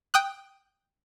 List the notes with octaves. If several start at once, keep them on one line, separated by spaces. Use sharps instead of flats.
G5 D#6 F#6